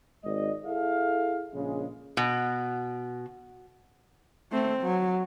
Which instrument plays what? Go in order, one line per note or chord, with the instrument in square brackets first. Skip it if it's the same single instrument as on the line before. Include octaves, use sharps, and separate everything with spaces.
[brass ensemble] G#1 G#3 D5 D#5
E4 G#4 A4 E5 F5
A#1 C#3 G#3
[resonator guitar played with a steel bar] B2
[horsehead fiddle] A3 C4
F#3